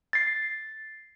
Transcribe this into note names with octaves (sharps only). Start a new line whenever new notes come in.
A6 C7